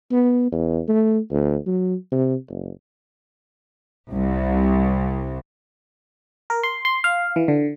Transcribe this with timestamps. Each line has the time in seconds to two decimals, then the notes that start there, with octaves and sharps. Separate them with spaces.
0.11 B3
0.52 E2
0.88 A3
1.31 D2
1.66 F#3
2.12 C3
2.49 F#1
4.11 C2
6.50 A#4
6.63 C6
6.85 C6
7.04 F5
7.36 E3
7.48 D3